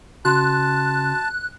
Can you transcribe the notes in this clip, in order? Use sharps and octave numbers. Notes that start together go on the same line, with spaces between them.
C#3 F#4 A5 C6 F#6